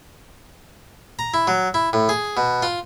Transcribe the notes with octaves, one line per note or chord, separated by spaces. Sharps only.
A#5
E4
F#3
E4
A2
G#4
B2
F4